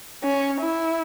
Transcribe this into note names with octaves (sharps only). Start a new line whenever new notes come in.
C#4
E4